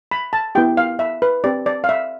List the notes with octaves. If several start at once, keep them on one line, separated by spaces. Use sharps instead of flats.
B5
A5
B3 E4 G4 G5
F5
E5
B4
C4 G4 D5
D5
F5
E5